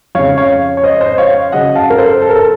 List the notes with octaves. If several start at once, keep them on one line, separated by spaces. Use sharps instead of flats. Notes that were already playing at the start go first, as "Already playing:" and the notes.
F2 C#3 C#5 F5
C#5 F5
C#5
C5 D#5
C5 D#5
C#5 F5
F#2 C#3 D#5 F#5
F5 A5
A#4
A4 C5
A4
A#4
A4